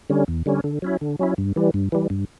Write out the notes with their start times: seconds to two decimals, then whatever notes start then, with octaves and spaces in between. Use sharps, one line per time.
0.10 D3 G3 C#4
0.28 E2
0.46 D3 G3 C#4
0.64 D3
0.82 F#3 C#4 E4
1.01 D3
1.19 F#3 C#4 E4
1.38 G2
1.56 E3 G3
1.74 G2
1.92 E3 G3
2.10 G2